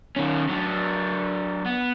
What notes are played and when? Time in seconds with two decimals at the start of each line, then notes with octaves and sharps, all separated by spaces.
0.16 D#3 C#4
0.49 F#3 D4
1.66 B3